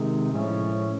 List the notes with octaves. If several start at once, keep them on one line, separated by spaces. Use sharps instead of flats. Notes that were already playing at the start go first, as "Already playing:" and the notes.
Already playing: C3 D#3 G#3 C4 D#4
A2 F3 G#3 C#4